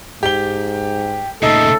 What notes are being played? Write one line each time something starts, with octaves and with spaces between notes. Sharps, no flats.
G#2 G4 G7
A#2 C#3 A3 D#4 A4